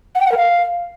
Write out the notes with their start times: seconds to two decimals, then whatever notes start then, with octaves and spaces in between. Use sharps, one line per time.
0.15 F#5
0.20 G5
0.26 F#5
0.31 A#4
0.37 F5